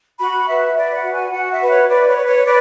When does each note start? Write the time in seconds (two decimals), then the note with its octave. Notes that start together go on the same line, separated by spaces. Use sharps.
0.19 F#4 B5
0.47 B4 E5
0.75 B4 D5
0.94 F#5
1.03 F#4
1.13 G#5
1.32 F#4 F#5
1.51 E5
1.61 B4
1.70 C#5
1.89 B4 D5
2.07 C#5
2.16 B4
2.26 C#5
2.45 B4 D5